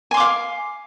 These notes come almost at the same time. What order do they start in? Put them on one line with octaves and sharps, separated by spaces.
G#5 C6 D6 F5